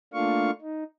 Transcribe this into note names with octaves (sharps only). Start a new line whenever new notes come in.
A3 A#3 D4 F4 F5 C#6
D#4